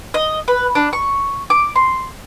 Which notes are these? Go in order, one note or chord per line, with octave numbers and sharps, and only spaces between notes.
D#5
B4
D4
C#6
D6
C6